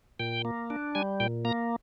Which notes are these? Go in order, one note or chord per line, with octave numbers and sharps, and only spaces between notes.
A#2 G5
A#3
D4
G3 G#5
A#2 G5
A#3 A#5